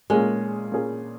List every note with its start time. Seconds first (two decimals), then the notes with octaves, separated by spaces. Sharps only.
0.10 A#2 G#3 A#3 C#4 G#4
0.72 A#2 A#3 C#4 G#4